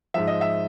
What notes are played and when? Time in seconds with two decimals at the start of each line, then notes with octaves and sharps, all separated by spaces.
0.14 G#2 F3 E5
0.27 D#5
0.41 E5